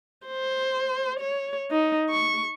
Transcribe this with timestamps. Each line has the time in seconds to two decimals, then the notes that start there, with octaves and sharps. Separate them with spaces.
0.27 C5
1.20 C#5
1.71 D#4
2.10 C#6